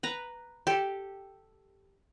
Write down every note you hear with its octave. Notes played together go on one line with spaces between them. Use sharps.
B4 A#5
G4 A4